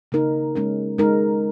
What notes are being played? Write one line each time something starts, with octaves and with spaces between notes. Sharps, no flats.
C#3 A#3 D#4 A#4
G#3 C#4 A#4
G#3 D#4 A#4